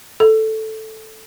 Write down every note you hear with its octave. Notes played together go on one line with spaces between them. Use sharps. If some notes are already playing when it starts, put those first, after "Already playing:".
A4